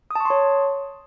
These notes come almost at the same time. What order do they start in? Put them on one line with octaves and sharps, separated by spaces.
D#6 A5 C#6 C6 C#5